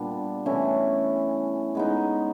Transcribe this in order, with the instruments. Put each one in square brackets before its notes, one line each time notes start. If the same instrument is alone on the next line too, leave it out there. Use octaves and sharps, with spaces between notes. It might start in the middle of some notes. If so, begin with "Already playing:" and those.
Already playing: [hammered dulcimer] A#2 G3 B3 D4
E3 A3 C#4 E4
G#3 B3 D#4